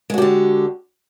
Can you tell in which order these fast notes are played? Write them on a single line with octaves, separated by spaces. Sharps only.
G#3 F#4 G4 D3